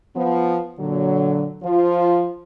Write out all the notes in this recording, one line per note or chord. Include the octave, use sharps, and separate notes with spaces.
F3 B3
A#2 D3 F#3
F3 F4